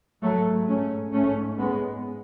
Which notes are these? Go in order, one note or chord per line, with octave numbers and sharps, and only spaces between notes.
G#2 F#3 A3
A3 C#4
G#2 A3 C#4
G#3 B3